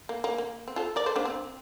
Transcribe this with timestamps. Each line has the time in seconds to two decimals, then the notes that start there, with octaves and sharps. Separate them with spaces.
0.09 A#3
0.24 A#3
0.38 A#3
0.68 C4
0.76 F4 A4
0.96 A#4 D5
1.06 A4 C5
1.16 A#3 D4
1.25 C4